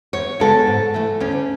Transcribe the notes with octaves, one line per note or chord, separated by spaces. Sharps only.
E2 C#5
C#3 G#3 B3 A4
G#2
E3 A3
D2 C#4